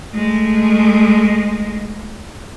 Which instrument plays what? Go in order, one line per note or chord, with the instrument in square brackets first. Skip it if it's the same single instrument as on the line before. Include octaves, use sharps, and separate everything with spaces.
[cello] G#3 A3